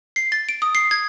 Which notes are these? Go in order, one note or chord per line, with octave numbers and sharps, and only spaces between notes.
C7
A6
D7
D#6
C7
G#6